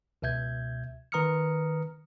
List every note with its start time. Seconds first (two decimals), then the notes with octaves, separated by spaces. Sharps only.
0.22 C#2 B2 E5 G6 G#6
1.12 D#3 B4 A#5 D#6 F6 C#7